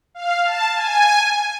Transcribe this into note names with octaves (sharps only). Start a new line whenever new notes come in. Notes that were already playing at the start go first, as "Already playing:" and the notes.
F5
A5
G#5